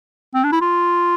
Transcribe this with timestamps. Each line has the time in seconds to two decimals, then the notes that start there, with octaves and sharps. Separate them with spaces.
0.35 C4
0.44 D4
0.52 E4
0.61 F4